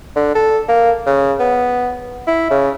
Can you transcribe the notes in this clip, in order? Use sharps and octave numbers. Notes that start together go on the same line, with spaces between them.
D3
A4
A#3
C#3
B3
E4
C#3